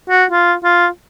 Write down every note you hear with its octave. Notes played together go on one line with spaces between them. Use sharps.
F#4
F4
F4